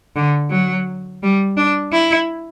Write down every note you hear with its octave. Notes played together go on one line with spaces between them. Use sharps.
D3
F#3
G3
D4
E4